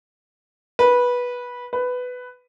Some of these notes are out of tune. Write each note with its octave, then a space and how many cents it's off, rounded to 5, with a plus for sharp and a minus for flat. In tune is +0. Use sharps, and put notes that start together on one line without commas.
B4 -15
B4 +10